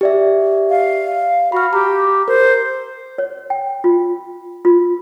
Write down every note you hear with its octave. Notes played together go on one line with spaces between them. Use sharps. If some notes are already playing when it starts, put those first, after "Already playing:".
G4 D5 E5
F5
F#4 B5 F6
G4 A#5
A#4 C5
C#5
G5
F4
F4